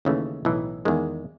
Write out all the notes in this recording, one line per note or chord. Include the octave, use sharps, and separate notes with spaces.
D#2 C#3 E3 A3
B1 A2 E3
E2 D#3 G#3